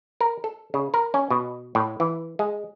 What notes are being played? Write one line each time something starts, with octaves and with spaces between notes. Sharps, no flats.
A#4
A4
C#3
A#4
C#4
B2
A2
E3
G#3